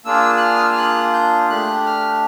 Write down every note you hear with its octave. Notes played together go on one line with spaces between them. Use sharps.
A#3 D4 F4 G#4 E6
F#6
F6
D#6
E6
F6
F#6
G6
A3 D4 G4 F#6
F6